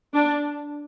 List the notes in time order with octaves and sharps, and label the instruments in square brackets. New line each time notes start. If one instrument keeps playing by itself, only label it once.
[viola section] D4